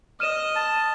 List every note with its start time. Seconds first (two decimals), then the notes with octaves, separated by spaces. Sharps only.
0.20 D#5 F6 D#7 E7
0.56 A5